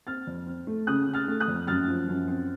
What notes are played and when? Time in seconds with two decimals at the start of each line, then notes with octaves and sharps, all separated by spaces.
0.07 C4 F6 A6
0.27 F2
0.47 C4
0.67 A3
0.87 C#3 D#6 F#6
1.07 C#3
1.14 F6 A6
1.28 A3
1.40 D#6 F#6
1.48 F2
1.67 F#2 F6 A6
1.88 F3
2.08 F#2
2.28 C4